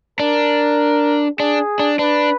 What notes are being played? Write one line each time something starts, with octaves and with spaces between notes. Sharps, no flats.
D4 A#4
D4 G#4
D4
D4 B4